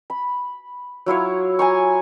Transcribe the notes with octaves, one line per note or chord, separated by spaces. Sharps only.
B5
F#3 E4 F4 C#5
G#5 A#5 C#6